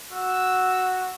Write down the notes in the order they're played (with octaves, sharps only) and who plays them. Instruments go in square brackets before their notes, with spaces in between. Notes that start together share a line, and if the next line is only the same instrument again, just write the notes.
[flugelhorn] F#4 [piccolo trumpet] E6